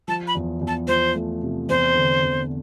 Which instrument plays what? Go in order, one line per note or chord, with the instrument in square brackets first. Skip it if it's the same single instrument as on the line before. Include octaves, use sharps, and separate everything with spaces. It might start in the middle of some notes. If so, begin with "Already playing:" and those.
[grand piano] F3 [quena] A5
[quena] B5
[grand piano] E2
E2
[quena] A5
[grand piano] F3 [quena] C5
[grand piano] A3
C3
[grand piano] E2 [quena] C5
[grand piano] D3
E2